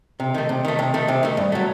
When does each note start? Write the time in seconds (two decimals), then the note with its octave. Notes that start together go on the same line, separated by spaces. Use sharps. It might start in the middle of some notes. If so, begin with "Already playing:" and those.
0.20 C3
0.34 D#3 A3
0.49 C3
0.65 D#3 A3
0.79 C3
0.94 D#3 A3
1.08 C3
1.23 D#3 A3
1.37 G2
1.52 F#3 A3